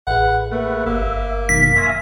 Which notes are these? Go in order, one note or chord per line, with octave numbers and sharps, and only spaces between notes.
A1 G#4 B4 F#5
A3 A#3 B4 F#5
G1 A#3 E5
F#2 B2 D#3 B6
E5 F5 G#5 C6 C#6 A#6